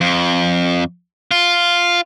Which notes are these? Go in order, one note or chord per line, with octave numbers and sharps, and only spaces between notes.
F2
F4